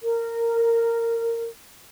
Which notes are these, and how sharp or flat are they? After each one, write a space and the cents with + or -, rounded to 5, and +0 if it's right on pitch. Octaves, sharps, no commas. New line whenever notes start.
A#4 -15